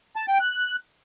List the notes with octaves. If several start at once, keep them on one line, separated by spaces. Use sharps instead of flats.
A5
G5
F#6